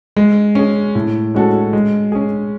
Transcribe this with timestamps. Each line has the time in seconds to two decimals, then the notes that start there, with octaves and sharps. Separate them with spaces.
0.16 G#3
0.55 C#4 G#4
0.95 A2
1.35 G#3 C#4 F#4 A4
1.73 G#3
2.12 C#4 G#4